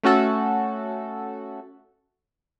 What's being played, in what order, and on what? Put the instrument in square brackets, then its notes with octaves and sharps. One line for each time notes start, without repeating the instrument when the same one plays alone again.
[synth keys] A3 C#4 F#4 A4